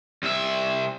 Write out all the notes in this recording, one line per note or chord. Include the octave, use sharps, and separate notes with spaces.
C2 E5